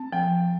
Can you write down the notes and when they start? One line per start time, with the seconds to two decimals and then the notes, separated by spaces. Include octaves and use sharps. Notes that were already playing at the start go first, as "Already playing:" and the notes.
Already playing: C4 A5
0.12 F3 G5